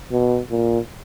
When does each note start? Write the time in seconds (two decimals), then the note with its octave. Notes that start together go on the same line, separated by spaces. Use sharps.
0.12 B2
0.51 A#2